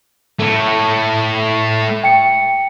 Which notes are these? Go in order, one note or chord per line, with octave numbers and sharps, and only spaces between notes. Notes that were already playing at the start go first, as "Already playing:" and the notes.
A3 E4
G5 C#7